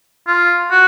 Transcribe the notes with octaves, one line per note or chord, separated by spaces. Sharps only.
F4
F#4